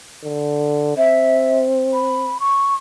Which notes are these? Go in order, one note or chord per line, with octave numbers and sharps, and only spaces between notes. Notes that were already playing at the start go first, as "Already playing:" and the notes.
D3
C4 E5
B5
C#6